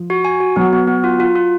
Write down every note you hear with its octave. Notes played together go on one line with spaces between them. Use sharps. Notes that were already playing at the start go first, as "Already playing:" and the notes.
Already playing: F3
F#4
G#5
F#4
F#3 B3
B3
B3
F4
F4
F4